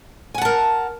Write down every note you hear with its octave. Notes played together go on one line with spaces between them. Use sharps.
A#4 F#5 G#5 A5